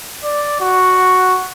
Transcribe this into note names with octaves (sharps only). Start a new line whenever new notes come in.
D5
F#4